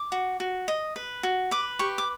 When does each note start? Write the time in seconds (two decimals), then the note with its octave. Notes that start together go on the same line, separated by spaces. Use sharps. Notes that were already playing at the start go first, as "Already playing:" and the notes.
Already playing: D6
0.12 F#4
0.40 F#4
0.68 D#5
0.96 B4
1.23 F#4
1.51 B4 D6
1.79 G4 C#6
1.98 D6